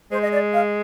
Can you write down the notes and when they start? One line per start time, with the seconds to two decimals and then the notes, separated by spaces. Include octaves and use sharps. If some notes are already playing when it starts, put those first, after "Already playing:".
0.11 G#3 C5
0.22 D#5
0.32 D5
0.53 F5